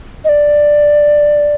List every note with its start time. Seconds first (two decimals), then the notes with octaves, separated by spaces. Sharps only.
0.24 D#5
0.29 D5